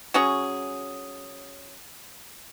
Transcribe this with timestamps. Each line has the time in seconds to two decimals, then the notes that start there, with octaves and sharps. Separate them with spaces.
0.14 F#3 C#4 G#4